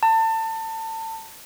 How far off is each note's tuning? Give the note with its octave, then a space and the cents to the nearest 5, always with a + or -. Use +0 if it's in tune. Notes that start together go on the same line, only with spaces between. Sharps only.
A5 +30